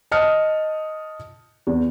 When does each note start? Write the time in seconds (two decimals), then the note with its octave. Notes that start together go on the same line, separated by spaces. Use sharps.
0.11 D#5 A5 D#6 F6 C#7
1.67 E2